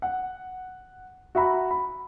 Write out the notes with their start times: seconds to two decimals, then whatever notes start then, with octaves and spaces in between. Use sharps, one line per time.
0.02 F#5
1.35 F#4 E5 A#5 B5
1.71 B5